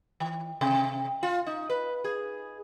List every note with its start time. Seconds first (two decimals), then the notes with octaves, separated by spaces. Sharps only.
0.20 E3
0.61 C3
1.23 F4
1.46 D#4
1.70 B4
2.04 G#4